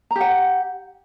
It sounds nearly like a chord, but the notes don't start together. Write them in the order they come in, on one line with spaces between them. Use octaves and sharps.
A#5 G4 F#5